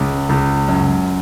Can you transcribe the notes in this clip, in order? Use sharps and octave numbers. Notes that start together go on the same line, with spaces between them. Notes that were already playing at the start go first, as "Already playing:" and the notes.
Already playing: C#2
C#2
F#2